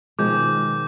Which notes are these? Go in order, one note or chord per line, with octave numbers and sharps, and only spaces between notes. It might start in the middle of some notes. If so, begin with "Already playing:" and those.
B2 D#3 F3 G#3 D6 G6